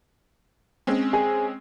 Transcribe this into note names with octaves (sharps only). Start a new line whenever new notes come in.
G#3 C4 C#4
G#4